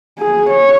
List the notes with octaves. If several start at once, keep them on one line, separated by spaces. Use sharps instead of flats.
G#4
C#5